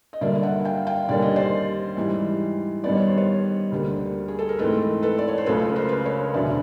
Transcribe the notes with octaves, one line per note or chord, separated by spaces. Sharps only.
D#5
G1 G2 D3 F#3 A#3 D5 E5
E5 F#5
F5 G5
F5 G5
D#2 D3 G3 A#3 C#4 D5
D#5
C5 D5
G#2 E3 G3
G2 D#3 G3 B3 D5
C#5
C5
B4 C#5
D2 D3 G3 A#3
G#4
A4
A#4
G#2 E3 A3 C4 A4 B4
A4 B4
D5
C#5
C5
C#2 C#3 F#3 A3 A4 B4
B4
A#4 C5
B4
C5
B4 C#5
E1 D2 D3 F#3 D5 E5